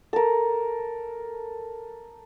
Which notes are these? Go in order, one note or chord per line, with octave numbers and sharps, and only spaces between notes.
A4 A#4